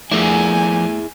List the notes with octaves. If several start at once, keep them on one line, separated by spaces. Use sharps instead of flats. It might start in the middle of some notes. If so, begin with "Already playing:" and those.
F3 A3 E4 G#4 A#4 D5 E5 G#5